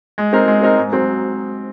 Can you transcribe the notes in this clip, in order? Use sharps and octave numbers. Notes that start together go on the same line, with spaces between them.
G#3
C4 D#4 A#4
G#3
C4 D#4 A#4
G#2
F#3 C4